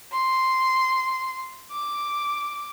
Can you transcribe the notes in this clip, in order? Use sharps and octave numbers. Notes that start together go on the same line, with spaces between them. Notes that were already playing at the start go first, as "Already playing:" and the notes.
C6
D6